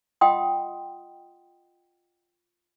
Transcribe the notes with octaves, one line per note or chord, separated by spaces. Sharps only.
F4 D#5 F#5 G5 C6 D#6